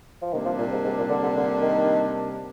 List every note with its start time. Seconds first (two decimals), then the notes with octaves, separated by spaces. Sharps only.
0.22 F3
0.32 C3 D#3 G3 A#3 D4
0.45 F3
0.58 A#2
0.72 G#2
0.85 G#2
0.98 A#2
1.10 D3
1.23 D3
1.36 D3
1.62 D#3